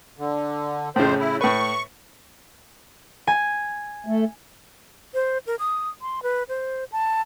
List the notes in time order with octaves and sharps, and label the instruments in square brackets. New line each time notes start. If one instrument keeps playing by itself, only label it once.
[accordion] D3
[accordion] F2 C5 [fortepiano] A2 C#3
[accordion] E4
[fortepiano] A2 B4 [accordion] C#6
[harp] G#5
[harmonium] A3
[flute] C5
A#4
D#6
C6
B4
C5
A5